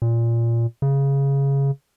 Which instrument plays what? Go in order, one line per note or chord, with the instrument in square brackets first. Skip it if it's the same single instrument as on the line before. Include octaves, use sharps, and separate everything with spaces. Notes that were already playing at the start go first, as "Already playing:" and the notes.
[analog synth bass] A#2
C#3